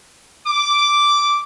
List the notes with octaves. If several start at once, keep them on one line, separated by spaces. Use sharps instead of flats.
D6